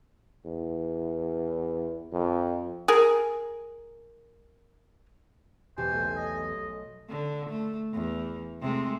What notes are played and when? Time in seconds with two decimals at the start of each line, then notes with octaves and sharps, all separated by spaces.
0.46 E2
2.13 F2
2.88 G#4 A#4
5.78 E2 B2 G4 C5 G#5
5.91 B1 A3
6.16 D#5
7.09 D3
7.49 A3
7.93 E2
8.61 C3 G#3 A3